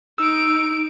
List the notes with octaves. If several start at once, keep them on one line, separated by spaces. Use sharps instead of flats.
D#4 E6 D7